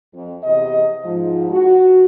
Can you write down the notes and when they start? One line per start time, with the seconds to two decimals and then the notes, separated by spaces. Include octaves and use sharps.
0.14 F2
0.43 E2 C3 D#5
1.05 G#2 F3
1.50 F#4